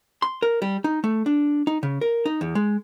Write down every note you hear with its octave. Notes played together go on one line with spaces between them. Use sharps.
C6
A#4
G3
D#4
A3
D4
D#4
C#3
A#4
D#4
E2
G#3